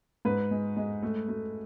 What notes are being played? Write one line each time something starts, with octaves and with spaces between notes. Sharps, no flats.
G#2 B4
G#3
G#3
A3
A3